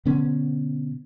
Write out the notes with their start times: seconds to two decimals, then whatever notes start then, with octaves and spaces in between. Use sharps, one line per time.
0.05 B2 D3 B3 C#4